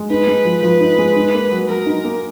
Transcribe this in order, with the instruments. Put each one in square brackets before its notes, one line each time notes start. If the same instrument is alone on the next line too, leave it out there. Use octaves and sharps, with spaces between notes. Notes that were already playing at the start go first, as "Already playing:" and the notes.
Already playing: [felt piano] G#3
[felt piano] D#4 [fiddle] B4
[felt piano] G#3
F3
[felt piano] F3 [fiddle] B4
[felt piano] D#4
G#3
D#4
A#3
F#3
[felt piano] F#3 [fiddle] A#4
[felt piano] D#4
A#3